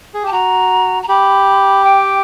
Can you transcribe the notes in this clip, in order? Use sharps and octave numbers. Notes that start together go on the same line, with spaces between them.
G#4
G4 A5
F#4 A#5
A#5
G4 B5
G5